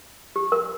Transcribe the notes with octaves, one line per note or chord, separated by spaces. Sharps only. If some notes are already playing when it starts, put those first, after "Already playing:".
G4
A#4